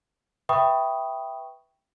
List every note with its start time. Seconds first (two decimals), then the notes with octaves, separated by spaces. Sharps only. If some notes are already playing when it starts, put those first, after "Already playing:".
0.49 B4 E5 G5 B5 C#6 D#6